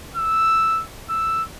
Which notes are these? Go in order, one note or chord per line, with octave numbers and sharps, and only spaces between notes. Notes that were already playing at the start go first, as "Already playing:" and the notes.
E6
E6